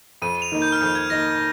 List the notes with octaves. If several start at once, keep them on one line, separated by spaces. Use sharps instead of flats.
F2 D#7
D#7
F7
D#3 A#3 D#4
G6
F6
F2 G6
G#6
D#3 A#3 D#4 A#6